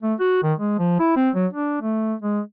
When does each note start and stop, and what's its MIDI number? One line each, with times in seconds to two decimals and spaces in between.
0.02 0.14 57
0.20 0.41 66
0.43 0.53 51
0.58 0.77 56
0.79 0.96 53
1.00 1.15 64
1.16 1.30 60
1.35 1.47 54
1.53 1.78 62
1.81 2.14 57
2.22 2.40 56